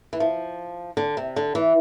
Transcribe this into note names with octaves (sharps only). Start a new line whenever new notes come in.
E3
F3
D3
C3
D3
E3